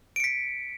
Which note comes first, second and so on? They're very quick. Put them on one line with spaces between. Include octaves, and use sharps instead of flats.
D7 C#7 B6